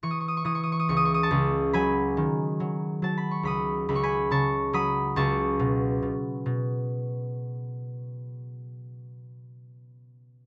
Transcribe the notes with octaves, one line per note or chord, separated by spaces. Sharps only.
E3 C#6
D#6
C#6
D#6
C#6
E3 D#6
C#6
D#6
C#6
D#6
C#2 C#6
D#6
C#6
D#6
A5 C#6
C#2
F#3 G#5 B5
D#3
F#3
F#3 A5
B5
C#6
C#2 B5 D#6
C#2 B5
C#6
G#5 B5
C#3 A5 C#6
F#3 B5 D#6
C#2 A5 C#6
B2
B2
B2